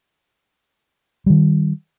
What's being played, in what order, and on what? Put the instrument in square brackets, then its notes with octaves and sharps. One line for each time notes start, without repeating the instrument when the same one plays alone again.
[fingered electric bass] D#3 G3